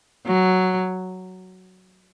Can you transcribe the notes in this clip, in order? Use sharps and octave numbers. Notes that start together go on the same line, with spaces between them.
F#3